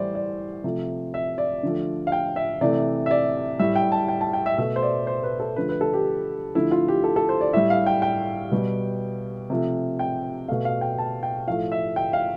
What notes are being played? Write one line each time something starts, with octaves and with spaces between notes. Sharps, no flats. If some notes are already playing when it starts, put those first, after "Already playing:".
Already playing: A2 E3 G3 C5 D5
D5
C3 F3 A3
E5
D5
D3 F3 A3
F5
G5
E5
C3 E3 A3 D5
E5
D5
A2 G3 E5
G5
A5
G5
A5
G5
E5
B2 A3 E5
C5
D5
C5
B4
A4
D3 F3 A3 B4
B4
A4
G4
D3 F3 A3 E4
F4
G4
A4
A4
C5
D5
A2 G3 E5
F5
G5
G5
B2 G3
C3 F3 A3
G5
B2 A3 F5
F5
G5
A5
G5
A2 F3 A3 F5
E5
G5
F5